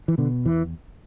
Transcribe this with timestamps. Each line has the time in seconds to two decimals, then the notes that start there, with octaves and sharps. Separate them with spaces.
0.08 E3
0.18 B2 D3
0.45 E2 E3